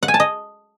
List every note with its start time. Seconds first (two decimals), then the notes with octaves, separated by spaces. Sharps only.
0.03 F#5
0.08 G#5
0.14 A5
0.20 D#5